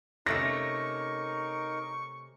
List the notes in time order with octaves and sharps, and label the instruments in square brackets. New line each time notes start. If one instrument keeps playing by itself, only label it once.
[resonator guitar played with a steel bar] C3 A3 C#4 [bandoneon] D#4 A#4 [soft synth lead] C#6 [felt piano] A#6